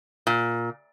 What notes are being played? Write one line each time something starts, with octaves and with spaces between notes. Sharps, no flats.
A#2